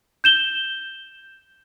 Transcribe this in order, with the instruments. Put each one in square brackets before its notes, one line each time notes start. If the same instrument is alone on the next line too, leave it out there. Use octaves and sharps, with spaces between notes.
[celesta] G6 E7 G7